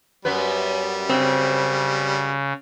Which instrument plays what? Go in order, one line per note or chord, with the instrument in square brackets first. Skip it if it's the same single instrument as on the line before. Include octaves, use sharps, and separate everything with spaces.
[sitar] F#2 B3 B4 [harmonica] G3
[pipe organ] C#3 [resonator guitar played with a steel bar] C4